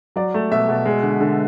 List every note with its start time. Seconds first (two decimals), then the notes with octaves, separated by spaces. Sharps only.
0.16 F#3 D5
0.34 A3
0.51 B2 E5
0.69 B2
0.85 G#3
1.03 D3
1.21 D3